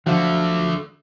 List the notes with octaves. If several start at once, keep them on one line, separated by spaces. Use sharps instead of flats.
D3 F3 F#3 A3